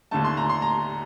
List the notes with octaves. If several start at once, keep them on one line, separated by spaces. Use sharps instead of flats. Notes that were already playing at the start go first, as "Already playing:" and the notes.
D#2 D3 A3 A5
C6
A#5
C6
A#5